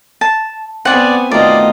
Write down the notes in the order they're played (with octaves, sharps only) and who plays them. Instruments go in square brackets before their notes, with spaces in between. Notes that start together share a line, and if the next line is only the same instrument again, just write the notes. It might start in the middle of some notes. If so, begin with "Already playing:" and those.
[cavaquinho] A5
[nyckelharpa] B3 G#5 [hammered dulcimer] C4 [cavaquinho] D5 F#5
[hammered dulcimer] B2 D#3 A3 [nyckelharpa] F4 D#5 [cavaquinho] D5